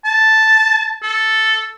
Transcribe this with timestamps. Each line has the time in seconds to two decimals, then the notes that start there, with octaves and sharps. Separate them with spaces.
0.05 A5
1.03 A4